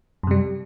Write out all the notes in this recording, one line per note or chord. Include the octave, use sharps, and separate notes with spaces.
F#2 C3 G3